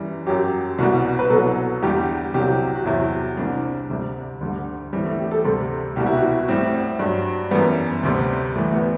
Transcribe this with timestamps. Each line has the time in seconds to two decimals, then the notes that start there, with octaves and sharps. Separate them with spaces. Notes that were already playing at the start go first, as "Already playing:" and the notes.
Already playing: F#2 E3 G3
0.27 F#2 F#3 G4
0.78 C2 B2 G3 F#4
1.19 B4
1.30 C2 B2 F#3 A4
1.82 E2 D3 G3 G4
2.34 C2 C3 F#3 G4
2.75 F#4
2.85 E2 C3 F#3 E4
3.37 C2 C3 G3 D4
3.89 D2 C3 G3
4.41 D2 D3 G3
4.92 A2 E3 G3 C4
5.05 A3
5.19 G4
5.31 A4
5.44 D2 C3 G3 A4
5.96 C2 B2 G3 G4
6.06 E4
6.14 F#4
6.31 E4
6.48 A2 G3 C4
6.99 G2 F#3
7.51 F#2 E3 G3 B3
8.03 D2 C3 G3
8.55 A2 E3 G3 A3
8.73 B3